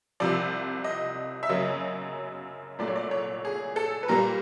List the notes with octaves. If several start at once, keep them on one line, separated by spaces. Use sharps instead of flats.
C2 C3 F3 D5
D#5
E5
F#2 C#3 F#3 A#3 D#5
C2 A#2 F#3 A3 D5
C#5
D5
C#5
G#4
A4
B4
A#2 G3 A#3 A#4